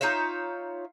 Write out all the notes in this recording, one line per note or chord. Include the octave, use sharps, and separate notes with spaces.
D#4 F4 C#5 E5